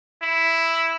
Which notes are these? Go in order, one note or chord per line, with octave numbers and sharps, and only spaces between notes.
E4